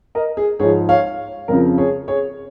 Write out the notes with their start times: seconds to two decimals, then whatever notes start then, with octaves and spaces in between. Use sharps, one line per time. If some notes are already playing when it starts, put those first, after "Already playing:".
0.15 A#4 D#5
0.37 G#4
0.59 G#2 F3 G#4 C#5
0.89 C#5 F5
1.48 F2 C#3 F3 A#4
1.78 G#4 C#5
2.08 G#4 C#5